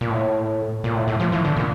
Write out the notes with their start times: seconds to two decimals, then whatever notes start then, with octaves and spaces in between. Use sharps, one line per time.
0.01 A#2
0.11 A2
0.84 A#2
0.95 A2
1.07 A2
1.20 F3
1.32 E3
1.45 D3
1.57 A#2